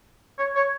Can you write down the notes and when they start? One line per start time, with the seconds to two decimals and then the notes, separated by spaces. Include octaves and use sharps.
0.39 C#5
0.55 C#5